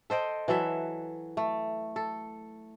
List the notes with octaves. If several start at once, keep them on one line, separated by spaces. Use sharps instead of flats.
A4 C5 D#5 G5
E3 F#3 A4 E5
A3
A4